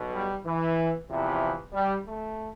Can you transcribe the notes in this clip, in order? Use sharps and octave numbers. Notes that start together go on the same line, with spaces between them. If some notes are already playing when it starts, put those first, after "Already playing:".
Already playing: B1 B2
G3
E3
E2 C3 E3 F3
G3
A3